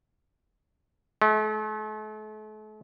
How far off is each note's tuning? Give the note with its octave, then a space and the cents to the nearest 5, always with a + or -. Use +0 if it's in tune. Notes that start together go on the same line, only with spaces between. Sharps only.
A3 -40